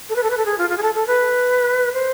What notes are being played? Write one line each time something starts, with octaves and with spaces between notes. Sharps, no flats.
A4
B4
A4
B4
A4
G#4
F4
F4
G#4
A4
A4
B4
C5